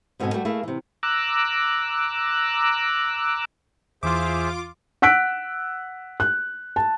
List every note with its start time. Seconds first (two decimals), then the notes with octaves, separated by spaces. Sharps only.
0.20 G#2 B2 D3 C4 A4 G#5
0.34 G3 A3 F#4 A4
0.45 A3 A#3 E4 G#4
0.63 C3 E3
1.03 A#5 D6 E6 F#6
4.03 E2 E3 F4 G#4 C5 E5 C6 D6
5.02 F#5 E6 F#6 B6 D7
6.20 F#6
6.76 A5